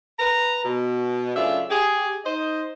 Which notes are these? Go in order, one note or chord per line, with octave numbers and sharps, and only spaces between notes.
B4 A#5
B2
F#2 C#3 A3 D4 F4 E5
G4 G#4
D#4 C5 D#5